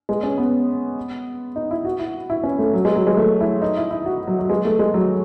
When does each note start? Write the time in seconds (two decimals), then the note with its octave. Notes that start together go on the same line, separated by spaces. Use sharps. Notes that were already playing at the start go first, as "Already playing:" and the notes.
0.09 G#3
0.23 C#4
0.38 B3
1.56 D#4
1.71 E4
1.85 F#4
1.99 E4
2.30 E4
2.43 C#4
2.59 A3
2.73 F#3
2.85 G#3
2.95 F#3
3.07 G#3
3.17 A3
3.40 E4
3.62 D#4
3.77 E4
3.91 E4
4.06 F#4
4.27 F#3
4.39 F#3
4.50 G#3
4.65 A3
4.79 G#3
4.94 F#3